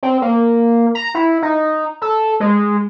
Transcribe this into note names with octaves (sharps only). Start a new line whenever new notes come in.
C4
A#3
A#5
E4
D#4
A4
G#3